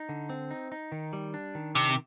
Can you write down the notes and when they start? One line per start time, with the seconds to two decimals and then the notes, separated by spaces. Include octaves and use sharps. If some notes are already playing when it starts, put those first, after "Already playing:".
Already playing: D#4
0.09 D3
0.30 C4
0.51 D#4
0.72 D#4
0.92 D#3
1.13 G3
1.34 D4
1.55 D#3
1.75 C3 D4